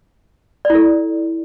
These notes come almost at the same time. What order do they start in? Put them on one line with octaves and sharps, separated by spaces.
D5 E4 A4